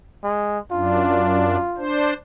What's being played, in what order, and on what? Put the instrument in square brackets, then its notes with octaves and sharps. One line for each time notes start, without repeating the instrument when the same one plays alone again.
[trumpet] G#3
[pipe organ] F#2 D4 [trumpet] F4
[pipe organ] D4 C5